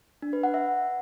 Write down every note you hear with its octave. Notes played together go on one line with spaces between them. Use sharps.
D4
B4
F#5
E5